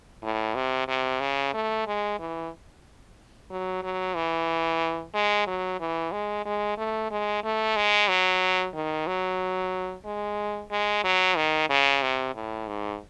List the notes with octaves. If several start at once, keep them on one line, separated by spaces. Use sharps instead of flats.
A2
C3
C3
C#3
A3
G#3
E3
F#3
F#3
E3
G#3
F#3
E3
G#3
G#3
A3
G#3
A3
G#3
F#3
D#3
F#3
G#3
G#3
F#3
D#3
C#3
C3
A2
G#2